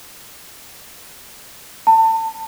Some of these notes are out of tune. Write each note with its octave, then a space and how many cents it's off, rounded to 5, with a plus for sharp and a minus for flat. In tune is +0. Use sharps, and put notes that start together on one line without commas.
A5 +30